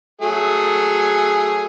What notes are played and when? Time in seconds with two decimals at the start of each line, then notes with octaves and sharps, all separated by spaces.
0.21 F#3 A3 G#4